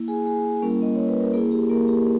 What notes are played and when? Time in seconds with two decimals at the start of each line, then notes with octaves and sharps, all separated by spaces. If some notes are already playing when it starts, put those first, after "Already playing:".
Already playing: A#3 E4
0.08 G#4 G#5
0.26 G#4 G#5
0.62 G3 A#3 C#4 E4 A#4
0.82 D#5
0.95 C#5
1.08 B4
1.21 A#4
1.33 A#3 E4 G#4
1.51 G4
1.70 A#3 A#4
1.88 G4